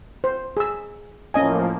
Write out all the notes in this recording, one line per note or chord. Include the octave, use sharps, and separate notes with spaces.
C5
G#4 E6
A2 F3 A#3 C#4 D#5 G#5